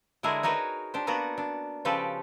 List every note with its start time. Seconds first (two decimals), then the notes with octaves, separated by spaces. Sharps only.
0.23 D3 G#3 E4 F#4 G#4 A#4
0.43 D#4 F#4 A#4 B4 C#5
0.94 D4 G4 C5
1.07 A#3 B3 D4 F#4 F#5
1.38 D4
1.85 C#3 F3 G4 A4 B4 D5